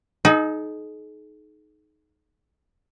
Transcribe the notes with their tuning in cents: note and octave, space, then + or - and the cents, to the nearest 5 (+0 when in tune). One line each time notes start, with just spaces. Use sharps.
D#4 +0 G#4 +45